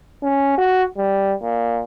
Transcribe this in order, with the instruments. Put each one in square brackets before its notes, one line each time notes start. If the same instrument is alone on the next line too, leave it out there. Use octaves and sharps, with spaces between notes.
[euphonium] C#4
F#4
G3
A#2